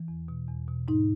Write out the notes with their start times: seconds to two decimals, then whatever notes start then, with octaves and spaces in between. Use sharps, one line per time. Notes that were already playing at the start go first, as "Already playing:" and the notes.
Already playing: E3
0.08 E2
0.28 B2
0.48 E2
0.68 B2
0.88 G#2 D#4